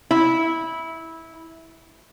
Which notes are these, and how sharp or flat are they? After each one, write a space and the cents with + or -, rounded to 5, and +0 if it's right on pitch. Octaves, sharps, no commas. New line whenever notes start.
E4 -15